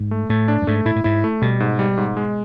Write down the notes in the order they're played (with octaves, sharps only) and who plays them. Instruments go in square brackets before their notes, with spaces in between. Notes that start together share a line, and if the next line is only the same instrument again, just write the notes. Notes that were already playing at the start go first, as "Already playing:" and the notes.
Already playing: [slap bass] G#2
[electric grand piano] A3
[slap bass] A2 [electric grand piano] A3
[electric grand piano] D4
[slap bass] G2
[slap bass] G#2 [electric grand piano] A3
[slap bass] A2 [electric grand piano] E4
[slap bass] A2
[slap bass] G#2 [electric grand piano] E4
[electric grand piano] A3
[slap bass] B2 [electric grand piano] G3
[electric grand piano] G#2
G3
G#2
G#3